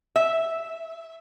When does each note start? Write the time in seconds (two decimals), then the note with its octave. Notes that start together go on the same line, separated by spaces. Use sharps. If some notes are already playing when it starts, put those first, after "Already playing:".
0.16 E5